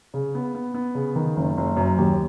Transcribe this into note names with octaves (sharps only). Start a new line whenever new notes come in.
C#3
B3
B3
B3
C#3
D#3
F#1
F#1
F#2
D#2